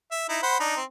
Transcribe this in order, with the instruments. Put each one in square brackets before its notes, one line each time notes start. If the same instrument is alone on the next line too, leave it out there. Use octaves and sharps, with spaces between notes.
[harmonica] E5
D#4 E4
C5 F#5 B5
D4 D#4
C4